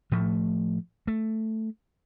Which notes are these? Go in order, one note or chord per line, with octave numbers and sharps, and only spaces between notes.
A2 F3 A3
A3